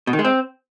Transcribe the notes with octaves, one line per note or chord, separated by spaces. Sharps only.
B2
D#3
G#3
C4